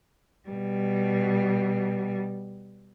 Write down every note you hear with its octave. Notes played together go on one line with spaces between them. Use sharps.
B2 G3